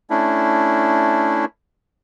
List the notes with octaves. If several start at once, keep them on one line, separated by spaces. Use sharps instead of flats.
A3 C#4 D4 E4